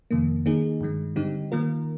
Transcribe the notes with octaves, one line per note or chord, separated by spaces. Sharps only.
F2 C3 D#3 A#3
D#3 A#3 D#4 G#4
G2 D#3 G#3
D3 G3 C4 D#4 G4
D#3 A#3 F4 A#4